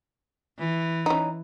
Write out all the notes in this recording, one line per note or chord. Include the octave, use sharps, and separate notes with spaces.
E3
C#4 D#4